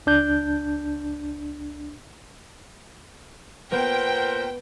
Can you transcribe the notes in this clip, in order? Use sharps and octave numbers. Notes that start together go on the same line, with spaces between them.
C#2 D4 G6
A#2 B3 A#4 C5 G5 G6